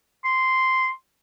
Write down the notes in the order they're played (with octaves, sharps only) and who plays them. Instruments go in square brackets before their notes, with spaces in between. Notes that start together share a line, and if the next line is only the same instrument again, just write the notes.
[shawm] C6